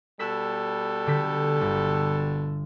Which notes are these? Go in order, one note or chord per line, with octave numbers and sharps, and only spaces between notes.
B2 G3 A4 E6 F#6 B6
D3 G4 B6
G1